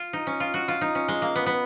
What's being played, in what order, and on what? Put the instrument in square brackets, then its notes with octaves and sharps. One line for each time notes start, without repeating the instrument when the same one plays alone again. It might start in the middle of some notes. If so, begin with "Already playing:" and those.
Already playing: [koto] F4
D#4
C#4
F4
F#4
F4
D#4
C#4
G#3
A#3
B3
B3